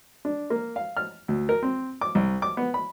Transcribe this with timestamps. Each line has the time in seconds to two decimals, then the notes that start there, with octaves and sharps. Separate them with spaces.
0.25 D4
0.50 A#3
0.76 F5
0.97 F6
1.28 D2
1.49 A#4
1.63 C4
2.01 D6
2.15 C2
2.42 D6
2.57 B3
2.74 B5